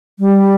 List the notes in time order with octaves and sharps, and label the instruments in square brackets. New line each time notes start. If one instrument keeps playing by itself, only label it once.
[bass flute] G3